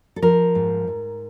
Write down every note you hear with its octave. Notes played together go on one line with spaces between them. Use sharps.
A4
F3 A#4
G#2
G#2